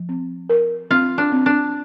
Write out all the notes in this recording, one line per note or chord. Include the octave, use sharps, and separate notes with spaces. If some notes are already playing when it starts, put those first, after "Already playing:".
Already playing: F3
C4
A#4
C4 F4
D4
C4
D4